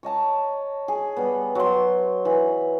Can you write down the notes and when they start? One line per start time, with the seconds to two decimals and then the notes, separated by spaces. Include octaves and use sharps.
0.03 C#5 D#5 A5 A#5
0.88 G#4
1.17 G3 B3
1.55 F#3 C6
2.25 E3 B5